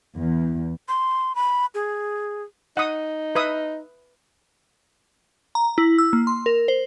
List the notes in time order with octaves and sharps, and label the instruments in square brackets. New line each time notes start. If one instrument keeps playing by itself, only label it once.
[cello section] E2
[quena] C6
B5
G#4
[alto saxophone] D#4 [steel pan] F#5 D#6
[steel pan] B4 E5 D#6
[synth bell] A#5
E4
E6
A#3
C6
A#4
C5